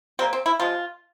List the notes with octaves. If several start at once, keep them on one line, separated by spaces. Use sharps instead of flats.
C3 G3 A#3 C4
C4
E4
C3 F3 G#3 F4